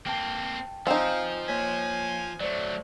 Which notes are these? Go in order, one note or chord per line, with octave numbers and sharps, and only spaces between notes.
A#3 C4 G5 A5
F3 C4 D#4 F5 G#5 G6
A#3 C#5 G#5 B6
F#3 A3 C5 D5